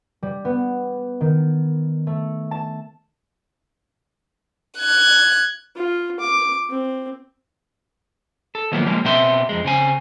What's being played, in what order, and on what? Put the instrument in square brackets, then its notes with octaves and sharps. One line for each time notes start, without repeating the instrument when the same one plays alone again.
[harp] G3
B3
D#3
A3
A5
[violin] F#6 G#6
[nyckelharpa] F4
D6
C4
[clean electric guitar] A4
D#3 F3 F#3 A#3 B3
F3 G3 G#3 A#3
B2 B3 C4 E5 C6
F2 G#3
C#3 C4 G#5